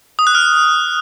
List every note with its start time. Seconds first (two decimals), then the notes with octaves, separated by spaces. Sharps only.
0.19 D#6
0.27 F#6
0.35 F6